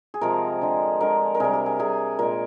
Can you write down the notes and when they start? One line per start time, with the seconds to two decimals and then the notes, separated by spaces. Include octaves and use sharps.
0.14 G#4
0.21 C3 F3 G#3 A#4
0.61 D3 G#3
1.01 D3 G#3 A#4
1.34 A#4
1.40 C3 G3 G#4
1.53 G4
1.66 G#4
1.79 C3 G3 G#4
2.19 A#2 G#3 A#4